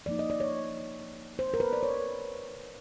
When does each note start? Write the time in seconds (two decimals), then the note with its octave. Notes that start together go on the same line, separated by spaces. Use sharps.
0.06 F3 A#3 D#4 D5
0.19 D#5
0.30 D5
0.40 C#5
1.39 C5
1.54 A#4
1.60 B4
1.73 D5
1.83 C#5